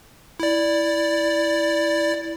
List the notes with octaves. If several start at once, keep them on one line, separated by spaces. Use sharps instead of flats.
E4 D5